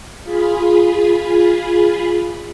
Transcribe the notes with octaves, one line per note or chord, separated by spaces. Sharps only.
F4 G#4 B5